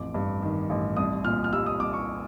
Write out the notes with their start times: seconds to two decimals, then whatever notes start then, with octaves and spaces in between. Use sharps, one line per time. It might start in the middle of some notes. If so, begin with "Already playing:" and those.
Already playing: A1 F2 D6
0.14 G2
0.42 D#3
0.70 A1
0.97 C2 D#6
1.24 A#2 F6
1.44 F6
1.53 G3 E6
1.66 D#6
1.80 C2 D6
1.93 C#6